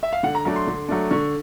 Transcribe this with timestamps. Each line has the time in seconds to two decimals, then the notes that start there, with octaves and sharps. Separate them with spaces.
0.03 E5
0.13 F5
0.23 D3 F#5
0.35 A#5
0.45 F#3 A3 D4 A#5
0.56 C6
0.67 D3
0.89 F#3 A3 D4
1.11 D3 C#6